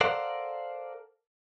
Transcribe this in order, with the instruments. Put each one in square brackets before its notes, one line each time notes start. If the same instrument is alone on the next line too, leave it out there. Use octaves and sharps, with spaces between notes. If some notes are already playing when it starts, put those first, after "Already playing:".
[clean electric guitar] A4 A#4 C5 D5 F5 F#5